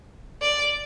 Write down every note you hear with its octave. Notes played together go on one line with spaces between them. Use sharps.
D5